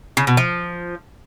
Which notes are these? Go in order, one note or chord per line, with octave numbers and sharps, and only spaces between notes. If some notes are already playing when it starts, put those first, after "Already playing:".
C#3
B2
F3